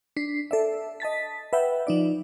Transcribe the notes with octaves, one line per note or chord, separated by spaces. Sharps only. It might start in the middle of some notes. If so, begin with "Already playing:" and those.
D4 B6 C7
A4 D5 E5
D#5 A5 A6 B6
B4 E5 F#5 G5
F3 D#4 D5